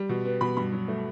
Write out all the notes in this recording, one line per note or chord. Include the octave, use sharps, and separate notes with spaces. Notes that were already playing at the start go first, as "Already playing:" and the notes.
Already playing: G3
B2
B3
B2 B5
G2 B5
F#3
A3